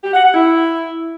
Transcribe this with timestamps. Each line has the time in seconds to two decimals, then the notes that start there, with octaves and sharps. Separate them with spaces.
0.03 G4
0.14 F#5
0.24 F#5
0.34 E4